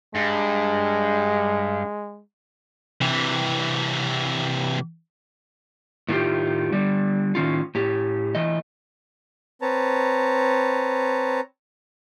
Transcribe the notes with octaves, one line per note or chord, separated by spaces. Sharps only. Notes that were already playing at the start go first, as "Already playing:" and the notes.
G2 G#3
C3 E3
A2 D#3 A3 B3 F4 G4
D3 G3
A2 D#3 C#4 F4
A2 G4
E3 A3 D#5
C4 B4 C#5 A5 A#5